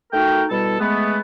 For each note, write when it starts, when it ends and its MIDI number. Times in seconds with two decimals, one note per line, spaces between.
0.13 0.44 57
0.13 0.44 63
0.13 0.44 66
0.13 0.44 70
0.13 0.44 79
0.50 0.77 47
0.50 0.77 55
0.50 0.77 64
0.50 0.77 69
0.79 1.19 56
0.79 1.19 57
0.79 1.19 59